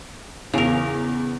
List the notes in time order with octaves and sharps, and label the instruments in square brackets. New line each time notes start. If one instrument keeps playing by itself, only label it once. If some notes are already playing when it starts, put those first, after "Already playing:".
[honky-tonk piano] E2 [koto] C#3 A#4